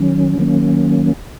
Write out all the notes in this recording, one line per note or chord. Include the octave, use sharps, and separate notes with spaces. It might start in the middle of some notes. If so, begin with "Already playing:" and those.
Already playing: D#3 F#3 C#4
D#3 F#3 A#3 C#4